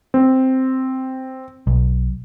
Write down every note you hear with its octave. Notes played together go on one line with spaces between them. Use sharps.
C4
B1